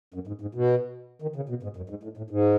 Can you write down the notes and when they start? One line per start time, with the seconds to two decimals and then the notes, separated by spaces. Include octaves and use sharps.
0.14 F#2
0.27 G#2
0.41 G#2
0.55 B2
1.22 D#3
1.36 C#3
1.49 B2
1.63 G#2
1.77 F#2
1.90 G#2
2.03 A2
2.17 A2
2.30 G#2